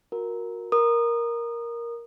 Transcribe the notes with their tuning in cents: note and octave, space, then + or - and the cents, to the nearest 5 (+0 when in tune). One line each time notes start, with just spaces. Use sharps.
F#4 -30 A#4 +0
A#4 +5 D#6 -25